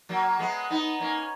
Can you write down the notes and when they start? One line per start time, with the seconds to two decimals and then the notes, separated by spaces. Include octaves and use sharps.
0.09 F#3 A#3
0.39 G#3 B3
0.70 B3 D#4
1.00 A#3 C#4